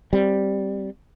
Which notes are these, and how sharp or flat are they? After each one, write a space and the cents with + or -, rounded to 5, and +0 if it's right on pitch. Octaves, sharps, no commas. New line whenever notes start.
G3 +0 C4 +0